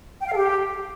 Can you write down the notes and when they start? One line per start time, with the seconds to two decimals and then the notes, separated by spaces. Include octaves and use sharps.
0.21 G5
0.26 F5
0.31 A4
0.36 G4